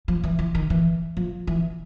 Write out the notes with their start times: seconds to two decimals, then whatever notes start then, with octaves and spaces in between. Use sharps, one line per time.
0.08 F3
0.23 E3
0.39 E3
0.55 D#3
0.70 E3
1.17 F3
1.47 E3